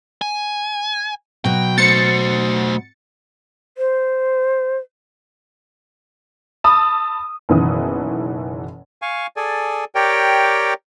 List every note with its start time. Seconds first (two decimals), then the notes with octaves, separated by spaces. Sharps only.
0.22 G#5
1.45 B2 F#3 G5
1.78 A3 C5 A6 C#7
3.78 C5
6.64 A5 B5 D#6 E6
7.49 F#1 B2 D#3 E3 D#6
9.02 F5 G#5 C#6
9.36 G#4 A4 D5 G#5
9.95 G4 A#4 C#5 D5 G5